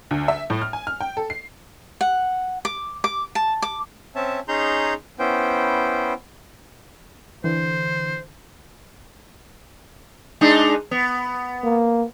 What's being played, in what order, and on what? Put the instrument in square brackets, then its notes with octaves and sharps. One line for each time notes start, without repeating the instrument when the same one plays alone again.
[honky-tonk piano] D2
E5
A2
F6
G#5
F6
G5
A4
C7
[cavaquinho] F#5
D6
D6
A5
D6
[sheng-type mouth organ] C4 C#4 C#5 E5 A5
C#4 D#4 G#4 A#5 C6 G6
B3 C#4 E4 C5 G5
[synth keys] D3 E3 [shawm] C5
[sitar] G#3 D4 D#4
B3
[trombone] A#3